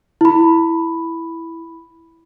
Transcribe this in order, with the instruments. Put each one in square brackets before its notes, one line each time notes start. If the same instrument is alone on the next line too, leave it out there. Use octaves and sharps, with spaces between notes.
[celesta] E4 B5